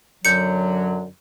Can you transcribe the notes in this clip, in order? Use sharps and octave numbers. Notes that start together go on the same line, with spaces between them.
F#2 D3 F#3 G6 C#7